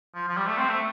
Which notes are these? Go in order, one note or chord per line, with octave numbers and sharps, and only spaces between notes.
F3
F3
G3
A3
C4
A3